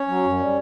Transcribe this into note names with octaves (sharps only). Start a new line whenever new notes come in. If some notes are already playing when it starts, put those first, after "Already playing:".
Already playing: C#4 C#5
F#3
F#2
G3